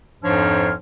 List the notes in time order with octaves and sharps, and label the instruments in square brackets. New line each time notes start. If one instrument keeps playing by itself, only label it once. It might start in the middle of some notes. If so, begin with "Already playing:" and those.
[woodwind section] F2 G#2 F3 D4 C#5 F6